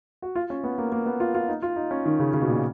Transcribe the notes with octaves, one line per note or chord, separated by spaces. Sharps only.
F#4
F4
C#4
B3
A#3
A#3
B3
F4
F4
D#4
F4
D#4
C#4
D#3
C#3
C#3
B2
A#2